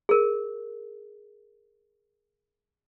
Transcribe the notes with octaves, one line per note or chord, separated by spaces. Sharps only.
G#4 A#4